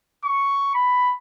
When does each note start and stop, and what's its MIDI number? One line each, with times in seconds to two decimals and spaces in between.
0.24 0.69 85
0.75 1.14 83